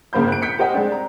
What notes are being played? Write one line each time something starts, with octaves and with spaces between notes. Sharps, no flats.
G1 C#3 A#3 C5 B5 G6
F#6 D7
G6 B6 C#7
G4 A#4 C5 D#5 F#5 G5
G#3 C4 D4
A#5